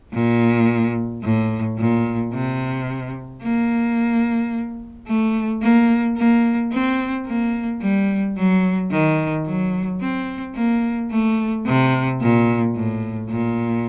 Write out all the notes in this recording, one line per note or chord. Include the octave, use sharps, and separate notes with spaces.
A#2
A2
A#2
C3
A#3
A3
A#3
A#3
C4
A#3
G3
F#3
D#3
F#3
C4
A#3
A3
C3
A#2
A2
A#2